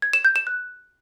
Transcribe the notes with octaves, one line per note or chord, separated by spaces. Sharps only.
G#6
E7
G6
E7
F#6